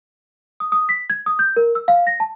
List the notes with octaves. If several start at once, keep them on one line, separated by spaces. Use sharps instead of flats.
D#6
D#6
B6
G#6
D#6
G6
A#4
E6
F5
A#6
A5